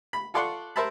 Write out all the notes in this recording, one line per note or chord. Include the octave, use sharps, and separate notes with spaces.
B5
F4 A4 D5 F#5 C6 C#6
A#4 C5 E5 A5 B5